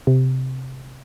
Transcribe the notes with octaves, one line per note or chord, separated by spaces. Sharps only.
C3